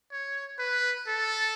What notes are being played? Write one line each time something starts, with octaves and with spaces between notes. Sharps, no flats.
C#5
B4
A4